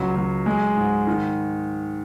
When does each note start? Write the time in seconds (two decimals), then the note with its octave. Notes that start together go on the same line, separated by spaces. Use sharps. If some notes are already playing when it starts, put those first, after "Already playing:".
Already playing: C#2 F#3
0.16 F#3
0.46 G#3
0.77 G#2
1.07 D#3